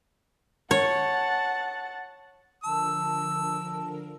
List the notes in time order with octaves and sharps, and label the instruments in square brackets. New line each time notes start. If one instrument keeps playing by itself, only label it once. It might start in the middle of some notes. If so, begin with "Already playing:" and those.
[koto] C#5 [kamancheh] F#5 A5
[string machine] D3 F3 A#4 [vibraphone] A5 [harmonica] E6